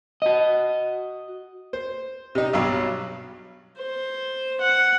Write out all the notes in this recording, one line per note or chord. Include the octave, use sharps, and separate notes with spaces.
F#4 D#5
C5
C3 D#4
B1 G2 F#3 E6
C5
F#5